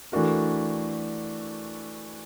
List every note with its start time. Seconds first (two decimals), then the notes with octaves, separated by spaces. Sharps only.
0.12 E3 A3 D4 F#4 A#4